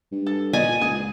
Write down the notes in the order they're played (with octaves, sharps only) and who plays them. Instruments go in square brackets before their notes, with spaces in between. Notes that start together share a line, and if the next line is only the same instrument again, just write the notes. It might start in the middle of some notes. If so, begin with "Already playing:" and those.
[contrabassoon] G2
[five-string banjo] A4
[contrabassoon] A#2 [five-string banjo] D5 D#5 [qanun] G#5
[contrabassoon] C#2 [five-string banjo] G#4